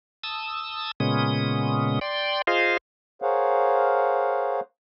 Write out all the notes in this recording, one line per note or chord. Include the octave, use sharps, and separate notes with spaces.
A5 D#6 E6
A#2 C#3 G#3 B3 C#4 D#6
D5 G5 C6
F4 G#4 C5 D#5 F5
G#4 A#4 C5 C#5 F5 F#5